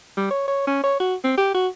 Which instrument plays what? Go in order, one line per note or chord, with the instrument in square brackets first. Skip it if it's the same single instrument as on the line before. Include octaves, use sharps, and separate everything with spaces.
[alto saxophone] G3
C#5
C#5
C#4
C#5
F#4
C4
G4
F#4